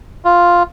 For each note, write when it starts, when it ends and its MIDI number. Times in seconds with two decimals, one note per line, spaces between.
0.25 0.63 65